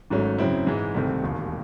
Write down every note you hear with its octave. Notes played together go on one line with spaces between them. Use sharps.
G#1 G#2 F#3 A3 C#4
F#2 C#3 F#3 C4 E4
G#2 E3 G#3
C2 C3 D#3 A3 C4
E1 D#2 D#3